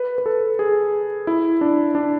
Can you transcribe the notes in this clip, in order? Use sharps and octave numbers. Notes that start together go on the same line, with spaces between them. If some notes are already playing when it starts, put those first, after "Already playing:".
Already playing: B4
B4
A4
G#4
E4
D4
D4